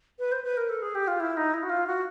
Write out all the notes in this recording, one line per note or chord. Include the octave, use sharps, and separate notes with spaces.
B4
C5
B4
A#4
A4
G#4
G4
F4
E4
D#4
E4
F#4
F4
F#4